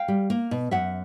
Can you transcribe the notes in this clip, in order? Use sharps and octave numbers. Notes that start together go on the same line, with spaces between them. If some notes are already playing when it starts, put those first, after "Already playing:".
Already playing: F5 G5
G3
A#3
B2
F#2 E5 F#5